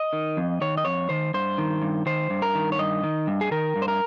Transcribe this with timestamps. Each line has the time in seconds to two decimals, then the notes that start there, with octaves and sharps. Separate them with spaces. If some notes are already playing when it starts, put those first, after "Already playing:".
Already playing: D#5
0.13 D#3
0.37 F2
0.61 D#3 C#5
0.77 D#5
0.85 F2 C#5
1.09 D#3 C5
1.34 G2 C5
1.58 D#3
1.82 G2
2.06 D#3 C5
2.30 G2
2.42 A#4
2.55 D#3
2.72 C#5
2.79 G2 D#5
3.03 D#3
3.27 G2
3.41 G#4
3.51 D#3 A#4
3.76 G2
3.82 C5
3.88 A#4